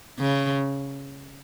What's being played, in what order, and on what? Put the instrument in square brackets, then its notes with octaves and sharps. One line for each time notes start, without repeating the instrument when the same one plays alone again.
[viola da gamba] C#3